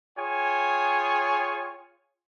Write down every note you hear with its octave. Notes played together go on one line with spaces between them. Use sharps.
F4 G#4 C#5 G5 G#5